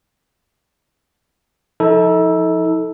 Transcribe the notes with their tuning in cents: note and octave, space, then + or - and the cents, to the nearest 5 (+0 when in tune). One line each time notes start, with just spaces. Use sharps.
F3 +0 D#4 +45 A4 +0